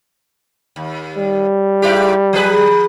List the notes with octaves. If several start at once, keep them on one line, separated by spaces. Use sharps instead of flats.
D#2
G3
G#2 E4 G4
F3 G#4 B4